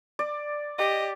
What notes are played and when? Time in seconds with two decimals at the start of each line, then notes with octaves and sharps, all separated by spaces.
0.19 D5
0.78 G4 D#5